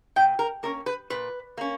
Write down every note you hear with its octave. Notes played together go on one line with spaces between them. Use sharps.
A#2 G5
A#4
A#3 C#4 A#4
B4
A#2 B4
A#3 C#4